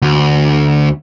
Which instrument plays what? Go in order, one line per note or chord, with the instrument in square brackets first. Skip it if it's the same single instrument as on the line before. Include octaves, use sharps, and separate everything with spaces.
[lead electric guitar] D2